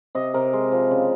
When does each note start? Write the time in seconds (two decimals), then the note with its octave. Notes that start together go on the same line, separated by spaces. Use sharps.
0.15 C3 D#5
0.34 C3 A#4
0.53 G#3
0.72 F3
0.91 C#3